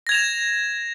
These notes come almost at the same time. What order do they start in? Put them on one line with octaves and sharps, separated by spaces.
A#6 G#6 F7 E7